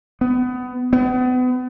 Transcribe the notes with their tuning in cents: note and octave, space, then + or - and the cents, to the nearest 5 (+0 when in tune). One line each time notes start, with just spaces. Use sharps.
B3 +25
B3 +35